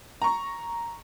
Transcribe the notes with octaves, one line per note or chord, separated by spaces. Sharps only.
A#5 C#6